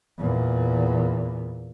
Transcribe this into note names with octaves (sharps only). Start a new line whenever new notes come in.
E2 A#2